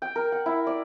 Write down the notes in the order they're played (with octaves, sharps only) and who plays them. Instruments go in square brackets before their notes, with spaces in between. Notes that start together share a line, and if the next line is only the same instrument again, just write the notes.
[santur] G5
A#4
F#5
E4
D5